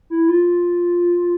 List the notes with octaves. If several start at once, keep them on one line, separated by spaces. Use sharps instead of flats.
E4
F4